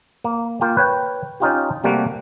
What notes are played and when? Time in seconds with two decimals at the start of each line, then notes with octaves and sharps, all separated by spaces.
0.24 A#3
0.61 A#3 F4 G5
0.77 B4 C#5 G5
1.40 C#4 D#4 F4 G4
1.84 C3 G3 A3 A#3 F#4